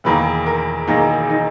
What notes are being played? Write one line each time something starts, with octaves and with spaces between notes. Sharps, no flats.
E1 E2 D#3 A#3 B4
A#4
E1 E2 D#3 A#3 D#4
D#4